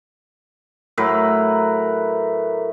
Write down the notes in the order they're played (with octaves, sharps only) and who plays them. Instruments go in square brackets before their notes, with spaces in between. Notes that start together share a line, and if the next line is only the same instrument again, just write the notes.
[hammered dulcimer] A2 F#3 A#4 B4